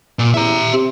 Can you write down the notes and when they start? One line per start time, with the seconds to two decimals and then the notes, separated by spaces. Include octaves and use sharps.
0.19 A#2
0.34 E2 E5 A#5
0.73 C3